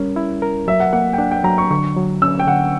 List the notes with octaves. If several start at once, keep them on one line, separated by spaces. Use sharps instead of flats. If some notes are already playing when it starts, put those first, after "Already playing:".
Already playing: G3 C#4 A#4
E4
A#4
F#3 E5
F#5
A#3 F#5
G5
D4 F#5
G5
F#3 A#5
C#6
D3 C#6
F#3
C#4 E6
G5
D3 F#5